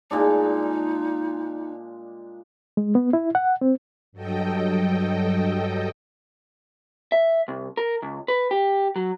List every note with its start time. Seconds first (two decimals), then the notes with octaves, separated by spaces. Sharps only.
0.11 A#2 G#3 D4 D#4
2.77 G#3
2.95 B3
3.13 E4
3.35 F#5
3.61 C4
4.12 G2 F#3 A4 D#5 G5
7.12 E5
7.48 C2
7.77 A#4
8.02 C#2
8.28 B4
8.51 G4
8.96 F#3